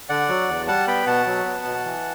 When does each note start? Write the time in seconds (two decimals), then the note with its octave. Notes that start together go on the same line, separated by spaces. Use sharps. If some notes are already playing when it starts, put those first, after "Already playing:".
0.09 D3 D5 F#5
0.29 F#3
0.48 E2
0.68 G3 F#5 A5
0.87 B3 G5 B5
1.07 B2 F#5 A5
1.26 F#3
1.46 B3
1.65 B2
1.85 E3